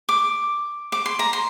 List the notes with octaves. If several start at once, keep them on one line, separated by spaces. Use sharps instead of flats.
D6
D6
C6
A#5
C6